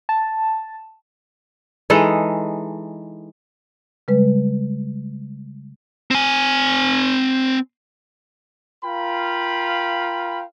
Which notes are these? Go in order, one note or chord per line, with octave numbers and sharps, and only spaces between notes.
A5
E3 G#3 D#4 A4
C#3 G3 G#3 B4
C4 G#5
F4 A#4 F5 G5 B5